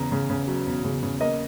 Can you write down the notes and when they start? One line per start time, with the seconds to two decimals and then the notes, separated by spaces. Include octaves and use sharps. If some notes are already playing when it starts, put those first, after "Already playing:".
Already playing: E2 C#3 A#5
0.12 C#3
0.30 C#3
0.47 F#3
0.66 E1
0.84 C#3
1.03 C#3
1.20 A#3 D#5